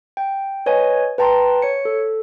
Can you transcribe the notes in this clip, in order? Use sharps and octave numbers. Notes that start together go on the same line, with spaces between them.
G5
B4 C#5 D#5 G#5
B4 G5 A5 A#5 C6
C#5 C#7
A4